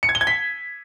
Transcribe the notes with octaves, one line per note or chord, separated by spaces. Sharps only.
C#7
G#6
G7
G#6
B6